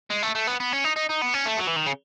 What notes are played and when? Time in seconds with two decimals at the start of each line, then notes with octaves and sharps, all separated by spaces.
0.10 G#3
0.22 A3
0.35 A3
0.47 B3
0.60 B3
0.73 C#4
0.84 D#4
0.96 D#4
1.09 D#4
1.21 B3
1.34 C#4
1.46 A3
1.59 F#3
1.68 E3
1.77 D#3
1.86 C#3